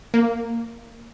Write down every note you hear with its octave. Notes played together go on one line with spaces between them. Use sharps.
A#3